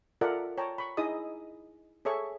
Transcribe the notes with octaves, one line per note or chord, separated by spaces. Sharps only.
F4 A4 A#4 D5 E5 F#5
C#5 G5 A5 A#5
B5 C#6
D#4 E4 G#4 D#5 D#6
G#4 A4 C#5 E5 C#6